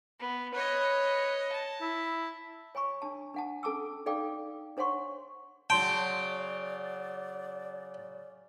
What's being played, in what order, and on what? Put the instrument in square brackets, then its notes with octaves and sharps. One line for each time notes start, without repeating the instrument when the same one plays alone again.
[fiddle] B3
[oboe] B4 [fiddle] C#5 D#5
[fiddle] A5
[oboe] E4
[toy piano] C#5 G#5 B5 C#6
D4 A5
D4 F#5 A5
C#4 A4 A5 D6 E6
D#4 A4 D5 F5 G5 D6
D4 C5 C#5 F#5 C6 C#6
[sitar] C#3 F#3 [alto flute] D5 [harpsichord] G5 [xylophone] A5 C6